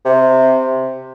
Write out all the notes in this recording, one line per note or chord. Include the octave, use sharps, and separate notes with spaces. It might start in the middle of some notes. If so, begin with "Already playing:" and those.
C3